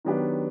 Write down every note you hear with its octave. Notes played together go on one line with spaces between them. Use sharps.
D#3 F#3 B3 D4 G4